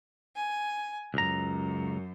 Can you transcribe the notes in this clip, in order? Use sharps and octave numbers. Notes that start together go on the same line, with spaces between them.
G#5
C#2 F#2 A#5